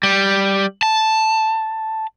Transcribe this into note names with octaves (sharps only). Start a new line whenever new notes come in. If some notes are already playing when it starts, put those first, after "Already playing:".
G3
A5